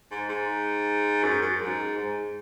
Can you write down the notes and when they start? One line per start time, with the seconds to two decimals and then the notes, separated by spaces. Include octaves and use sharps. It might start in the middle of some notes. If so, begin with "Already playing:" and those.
0.11 G#2
0.29 G#2
1.24 F#2
1.42 F#2
1.61 G#2
1.97 G#2